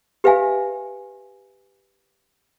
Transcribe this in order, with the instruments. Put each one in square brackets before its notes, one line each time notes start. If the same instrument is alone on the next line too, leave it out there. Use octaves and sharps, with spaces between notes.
[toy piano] G4 B4 E5 F5 G#5